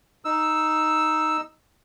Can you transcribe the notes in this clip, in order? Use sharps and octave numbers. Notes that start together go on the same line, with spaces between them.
D#4 E6